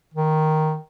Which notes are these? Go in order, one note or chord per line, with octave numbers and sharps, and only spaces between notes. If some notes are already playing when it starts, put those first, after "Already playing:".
D#3